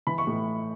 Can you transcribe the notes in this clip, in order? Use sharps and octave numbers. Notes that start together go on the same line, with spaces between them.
E3 B5
C#6
A2